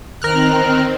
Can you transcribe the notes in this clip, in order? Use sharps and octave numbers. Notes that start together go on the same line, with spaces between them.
D#3 C4 A#4 F6 F#6